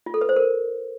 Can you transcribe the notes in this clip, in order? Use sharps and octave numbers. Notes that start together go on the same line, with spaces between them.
F4
A4
B4
C5
A#4